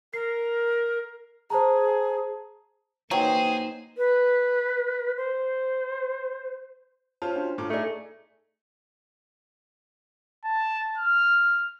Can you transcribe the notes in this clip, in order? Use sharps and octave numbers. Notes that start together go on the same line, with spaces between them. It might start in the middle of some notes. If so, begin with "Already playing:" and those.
A#4 C7
G#4 C5 A5 A#5
F#3 A#3 D#4 G#4 B4 C5 G5
B4
C5
C#4 F4 C5 A5
D4 F#4
A2 E4 F4 D6
A3 D#4 G#4 A4 D5
A5
F6